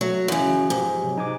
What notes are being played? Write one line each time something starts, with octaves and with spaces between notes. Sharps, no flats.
F#3 A3
F#2 C#3 E3
G#2 F3 F4 G4
C3 F#3
D#4 G#5 D6